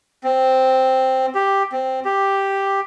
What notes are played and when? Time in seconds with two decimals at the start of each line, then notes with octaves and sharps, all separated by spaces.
0.24 C4
1.35 G4
1.72 C4
2.05 G4